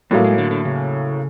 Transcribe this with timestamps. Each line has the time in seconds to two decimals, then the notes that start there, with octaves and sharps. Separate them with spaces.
0.11 A2 F#3 G3 A#3
0.24 G#3
0.38 D3
0.51 D3
0.65 C#3